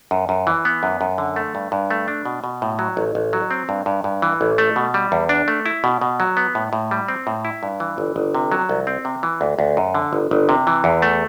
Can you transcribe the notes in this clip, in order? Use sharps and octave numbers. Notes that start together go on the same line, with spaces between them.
F#2
F#2
E3
B3
F#2
F#2
D3
A3
G2
G2
A3
D4
B2
B2
A2
F#3
A1
A1
F#3
C4
G2
G2
G2
E3
A1
A3
B2
G3
E2
D4
A3
E4
B2
B2
F#3
B3
A2
A2
G3
C4
A2
E4
G2
E3
G1
G1
C3
F#3
C2
C4
C3
E3
D2
D2
F#2
D3
G1
G1
C3
E3
E2
A3